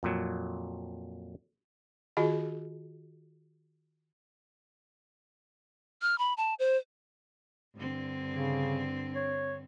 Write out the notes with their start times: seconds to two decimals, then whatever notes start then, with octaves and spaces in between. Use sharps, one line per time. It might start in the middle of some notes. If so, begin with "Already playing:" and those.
0.03 F2 A#2 F#3
2.17 D#3 F4 F#4 G#4 D#5
6.02 F6
6.18 B5
6.37 A5
6.59 C5
7.75 G2 D3 C4
8.31 C#3
9.15 C#5